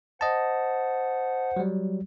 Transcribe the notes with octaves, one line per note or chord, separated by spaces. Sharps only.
C5 D#5 F#5 A5
F#3 G3